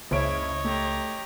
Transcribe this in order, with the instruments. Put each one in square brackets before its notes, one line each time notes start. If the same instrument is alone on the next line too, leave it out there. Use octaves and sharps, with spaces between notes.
[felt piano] F#1 C#4 D7 [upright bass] C#2 [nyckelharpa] E4 [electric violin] C#5 D#5
[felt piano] A3 [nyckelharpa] G4 A#5